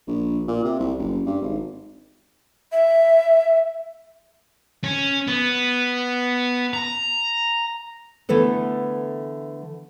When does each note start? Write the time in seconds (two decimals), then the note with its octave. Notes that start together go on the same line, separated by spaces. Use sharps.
0.08 A#1
0.48 A#2
0.64 C3
0.79 C2
0.98 F#1
1.26 G2
1.42 G#1
2.72 E5
4.84 C#4
5.27 B3
6.74 A#5
8.29 D3 E3 A3 B3 A4 B4